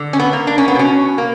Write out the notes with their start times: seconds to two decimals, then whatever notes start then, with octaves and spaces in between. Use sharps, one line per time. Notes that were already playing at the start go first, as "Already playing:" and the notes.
Already playing: D3
0.13 C#4
0.19 B3
0.33 A#3
0.47 D4
0.58 C#4
0.68 B3
0.75 B2 C#4
1.18 A#3